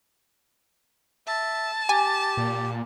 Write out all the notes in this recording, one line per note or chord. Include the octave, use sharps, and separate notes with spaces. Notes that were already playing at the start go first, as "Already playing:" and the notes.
E5 A5
G4 G#5
A#2